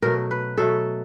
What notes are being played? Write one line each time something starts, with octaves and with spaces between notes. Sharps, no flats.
B2 F#3 A3 A#4
B4
B2 F#3 A3 A4